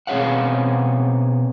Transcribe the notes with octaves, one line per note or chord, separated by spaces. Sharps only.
B2 C4 G#4 C#5 F5 F#5